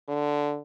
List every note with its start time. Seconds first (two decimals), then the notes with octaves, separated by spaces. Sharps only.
0.09 D3